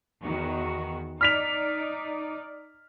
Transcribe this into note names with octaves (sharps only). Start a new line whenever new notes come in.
E2 D#3 F#4
D#4 D5 F6 B6 F7